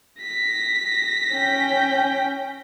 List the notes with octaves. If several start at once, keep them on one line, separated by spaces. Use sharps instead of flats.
A#6 B6
C#4 G5